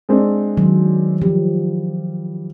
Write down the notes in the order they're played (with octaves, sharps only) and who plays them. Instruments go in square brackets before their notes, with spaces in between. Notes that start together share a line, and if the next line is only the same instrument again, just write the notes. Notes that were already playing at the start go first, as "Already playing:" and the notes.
[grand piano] G#3 C4 D4
[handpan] D#3 F#3
[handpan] F3 [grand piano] G3